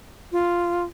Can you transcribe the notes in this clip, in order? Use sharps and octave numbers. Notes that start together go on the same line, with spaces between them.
F4